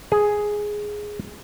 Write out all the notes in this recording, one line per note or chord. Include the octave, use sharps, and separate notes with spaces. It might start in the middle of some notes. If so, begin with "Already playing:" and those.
G#4